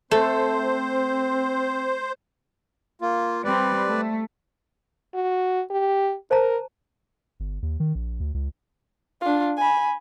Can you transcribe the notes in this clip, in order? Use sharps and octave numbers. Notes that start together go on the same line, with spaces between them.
A3 C4 A4 C5
A#3 F4
G3 C4 B4 D5
A3
F#4
G4
A#4 C5 A5 A#5
G1
D#2
D#3
A#1
D2
C#2
D4 F4
G#5 B5